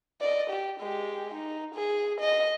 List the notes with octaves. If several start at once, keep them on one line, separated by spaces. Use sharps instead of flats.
D5 D#5
G4
G#3 G4
D#4
G#4
D#5